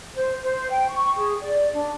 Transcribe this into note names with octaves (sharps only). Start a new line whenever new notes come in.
C5
C5
G5
C#6
G#4
D5
D4